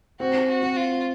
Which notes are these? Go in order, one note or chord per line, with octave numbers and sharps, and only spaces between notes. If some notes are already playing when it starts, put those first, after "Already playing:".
C4 F#4
F#4
C4
F4